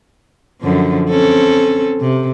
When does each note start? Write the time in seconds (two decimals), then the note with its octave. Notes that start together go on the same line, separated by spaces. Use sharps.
0.61 F#2 D3 F3
1.09 C4 C#4 A4
2.00 C3